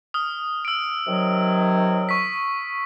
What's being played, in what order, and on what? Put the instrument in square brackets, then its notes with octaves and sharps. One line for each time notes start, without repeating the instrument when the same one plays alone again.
[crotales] D#6 F6
E6 D7
[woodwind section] C3 D#3 F#3
[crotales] C#6 B6